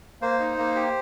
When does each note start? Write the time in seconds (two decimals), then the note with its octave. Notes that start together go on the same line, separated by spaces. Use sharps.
0.22 A#3 C5
0.40 D#4
0.58 A#3
0.75 G4